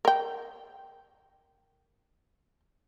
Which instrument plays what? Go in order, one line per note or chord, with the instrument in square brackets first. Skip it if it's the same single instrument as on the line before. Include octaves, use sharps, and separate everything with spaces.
[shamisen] A#4 G5